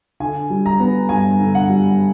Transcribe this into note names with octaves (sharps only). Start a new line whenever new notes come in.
D3 G#5
G3
A#5
B3
G2 G#5
D3
F#5
G3